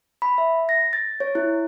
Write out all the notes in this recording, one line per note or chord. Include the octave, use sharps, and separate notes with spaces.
B5
E5
A#6
A6
C#5
E4